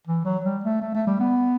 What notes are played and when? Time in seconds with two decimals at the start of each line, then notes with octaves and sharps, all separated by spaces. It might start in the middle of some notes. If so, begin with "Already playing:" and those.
0.07 E3
0.25 F#3
0.44 G3
0.64 A3
0.82 A3
0.95 A3
1.07 G3
1.20 B3